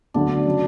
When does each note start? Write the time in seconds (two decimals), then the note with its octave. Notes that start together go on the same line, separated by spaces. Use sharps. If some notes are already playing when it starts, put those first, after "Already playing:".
0.14 D2 D3 F#3 A3 D4
0.46 C#3 F#3